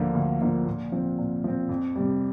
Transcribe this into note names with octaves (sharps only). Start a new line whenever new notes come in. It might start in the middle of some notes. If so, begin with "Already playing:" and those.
Already playing: D2 D3 F3 A#3 F4
D2
D3 F3 A#3 F4
A#2
F3 C4
A#2
F3 C4
F2
C3 G3